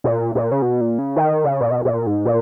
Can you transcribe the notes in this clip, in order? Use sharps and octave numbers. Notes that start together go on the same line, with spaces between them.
B2
A#2
A#2
C#3
B2
A#2
C#3
D#3
C#3
A#2
B2
B2
A#2
G#2
A#2